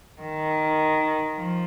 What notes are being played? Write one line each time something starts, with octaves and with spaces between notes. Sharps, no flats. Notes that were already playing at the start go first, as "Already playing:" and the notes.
D#3
F3